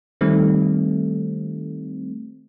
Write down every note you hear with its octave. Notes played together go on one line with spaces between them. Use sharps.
D#3 G3 A3 C4